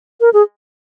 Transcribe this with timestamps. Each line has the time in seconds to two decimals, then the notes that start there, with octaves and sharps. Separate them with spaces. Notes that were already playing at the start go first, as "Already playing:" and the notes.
0.21 A#4
0.34 G#4